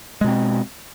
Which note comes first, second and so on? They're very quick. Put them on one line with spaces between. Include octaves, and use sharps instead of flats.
G#3 B2 C4